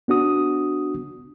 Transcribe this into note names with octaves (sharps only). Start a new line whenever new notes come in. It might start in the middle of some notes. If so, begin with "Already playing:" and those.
B3 D4 F#4 D#6